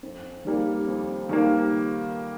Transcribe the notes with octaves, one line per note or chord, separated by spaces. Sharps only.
F2
D#3 G3 A#3
F2
D#3 G3 A#3